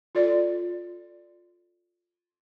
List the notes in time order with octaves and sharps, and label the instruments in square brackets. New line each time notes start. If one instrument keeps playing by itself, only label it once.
[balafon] F4 A4 D5